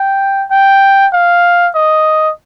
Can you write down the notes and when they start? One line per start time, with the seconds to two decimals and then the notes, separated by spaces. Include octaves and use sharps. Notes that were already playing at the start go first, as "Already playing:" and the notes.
Already playing: G5
0.51 G5
1.13 F5
1.75 D#5